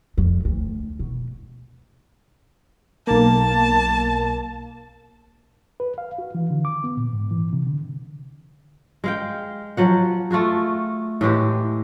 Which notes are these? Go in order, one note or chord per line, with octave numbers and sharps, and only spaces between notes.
F2
D2
B2
B1 A#3 A5
B4
F5
F#4
E3
D3
D6
B3
A#2
G#2
E3
C3
D3
G#3 F5 G5
F3 F#3 F#5
A3 F4 F#4 G#4
A2 E3 G#3 G4